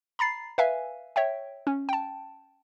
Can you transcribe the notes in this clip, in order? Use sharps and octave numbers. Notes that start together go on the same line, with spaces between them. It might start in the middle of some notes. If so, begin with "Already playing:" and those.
A#5 B5 A6 C7
B4 E5 F5 G#5
C#5 E5 G5
C#4
G5 A5